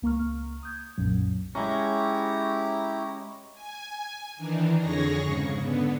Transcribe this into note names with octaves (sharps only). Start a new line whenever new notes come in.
C#2 A#3 A#5 C#6 F6
D#6 G6 G#6
B1 F#2 A#2 F#3
G#3 C#4 E4 G4 A#5
G#5
D#3 E3 D4 D#4
F2 D3 G#4 C#5 C#6 A#6
G#2 C#3
D3 B3